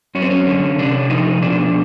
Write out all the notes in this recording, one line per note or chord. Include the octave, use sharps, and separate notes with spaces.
F#2 C#4
C4
C#4
D3
C3 D4
F3 D#4
B2 D4